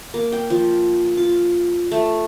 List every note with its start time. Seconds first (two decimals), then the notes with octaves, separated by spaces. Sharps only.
0.14 A#3
0.32 G5
0.50 F3
1.17 F4
1.91 A3